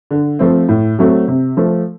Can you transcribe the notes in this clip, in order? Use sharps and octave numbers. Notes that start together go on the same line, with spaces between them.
D3
F3 A3 C4
A2
F#3 A3 C4
C3
F3 A3